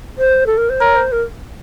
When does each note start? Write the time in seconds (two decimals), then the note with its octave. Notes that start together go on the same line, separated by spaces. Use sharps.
0.18 C5
0.46 A4
0.57 A#4
0.69 C5
0.80 A#4 C#5
0.96 C5
1.12 A#4